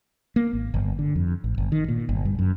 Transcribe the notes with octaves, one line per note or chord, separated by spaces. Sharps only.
A#3
G#1
G1
D3
F2
A1
G1
D#3
A#2
G1
G2
F#2